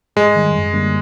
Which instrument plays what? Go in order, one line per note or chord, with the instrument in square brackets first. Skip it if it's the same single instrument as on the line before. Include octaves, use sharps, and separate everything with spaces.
[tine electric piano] G#2 [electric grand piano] G#3
[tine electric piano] D#3 G3
F#2
D3 G3 A#3 D4